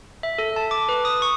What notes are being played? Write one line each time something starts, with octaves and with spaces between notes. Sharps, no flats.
E5
A4
A5
D6
B4
D#6
C#6